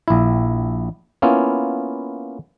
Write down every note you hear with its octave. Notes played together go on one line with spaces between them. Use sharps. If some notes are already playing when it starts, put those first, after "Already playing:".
A#1 E4
A#3 B3 C#4 E4 F4